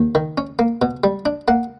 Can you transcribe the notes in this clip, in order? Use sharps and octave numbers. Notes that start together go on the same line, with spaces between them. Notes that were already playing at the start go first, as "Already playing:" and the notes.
Already playing: D#2
D#3
C#4
A#3
B2
G3
D4
A#3 F#5